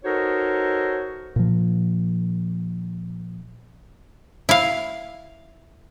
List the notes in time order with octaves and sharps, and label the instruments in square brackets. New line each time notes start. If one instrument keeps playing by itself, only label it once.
[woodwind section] D#4 F#4 A4 A#4 C5 C#5
[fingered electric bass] A#2 F3
[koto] E4 F5